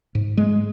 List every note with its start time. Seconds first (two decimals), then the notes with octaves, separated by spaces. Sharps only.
0.15 G#2
0.37 G#3